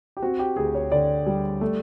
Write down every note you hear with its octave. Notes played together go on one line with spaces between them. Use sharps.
G4
C4 F#4
G4
D2 G#4
C#5
D3 D5
G3
A3